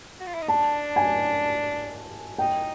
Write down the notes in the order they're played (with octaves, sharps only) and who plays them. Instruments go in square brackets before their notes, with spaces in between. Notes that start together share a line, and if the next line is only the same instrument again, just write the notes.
[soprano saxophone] F#4
F4
E4
D#4
[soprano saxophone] D4 [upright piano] A5
[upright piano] G#5
[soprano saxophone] D#4 [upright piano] G5